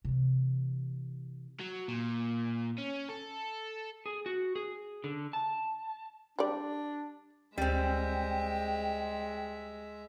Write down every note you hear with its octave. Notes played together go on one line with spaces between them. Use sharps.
C3 E3
F#3
A#2
C#4
A4
G#4
F#4
G#4
D3
A5
G3 D4 D5
D2 G3 G#3 C4 E5 G5